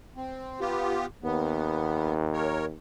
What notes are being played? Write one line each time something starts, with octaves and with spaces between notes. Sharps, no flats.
C4
B3 F4 G4
D#2 B3
A#4 C#5